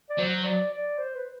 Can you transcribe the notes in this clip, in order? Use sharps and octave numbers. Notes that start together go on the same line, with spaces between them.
D5
F#3 C5
D5
D5
C5
B4